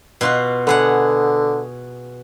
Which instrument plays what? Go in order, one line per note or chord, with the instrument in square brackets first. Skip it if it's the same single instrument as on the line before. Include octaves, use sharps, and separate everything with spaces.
[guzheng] B2 F4 F#4
[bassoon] D3 [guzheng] B3 G#4 F#5